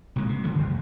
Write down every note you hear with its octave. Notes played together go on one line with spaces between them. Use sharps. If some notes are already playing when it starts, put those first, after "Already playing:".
A#1 C3 G#3 A#3
C3
G1 D3 G3 A3
F1